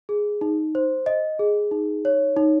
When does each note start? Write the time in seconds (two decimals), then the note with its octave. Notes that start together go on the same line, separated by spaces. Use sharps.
0.09 G#4
0.41 D#4
0.75 C5
1.06 D#5
1.39 G#4
1.71 D#4
2.05 C#5
2.37 D#4